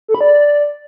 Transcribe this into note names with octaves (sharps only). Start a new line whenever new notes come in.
A4
B5
D5